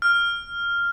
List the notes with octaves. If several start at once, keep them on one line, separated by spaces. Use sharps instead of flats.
F6